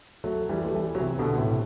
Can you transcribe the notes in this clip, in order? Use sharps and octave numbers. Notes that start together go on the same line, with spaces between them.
F#3 A3
E3 G3
A3
E3 G3
F#3
C3 E3
B2 D3
A2 C3